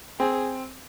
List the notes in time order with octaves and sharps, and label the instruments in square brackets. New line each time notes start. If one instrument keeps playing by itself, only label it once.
[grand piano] C4 [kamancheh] G#4